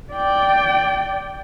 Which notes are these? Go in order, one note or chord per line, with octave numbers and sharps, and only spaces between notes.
D5 G5